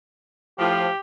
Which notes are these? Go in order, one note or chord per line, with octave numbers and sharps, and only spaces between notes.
A2 F3 G4